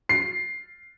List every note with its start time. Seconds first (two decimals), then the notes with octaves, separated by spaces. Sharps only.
0.09 C7